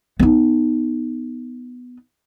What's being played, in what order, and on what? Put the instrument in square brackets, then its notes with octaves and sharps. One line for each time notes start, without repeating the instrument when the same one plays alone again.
[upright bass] B3 D#4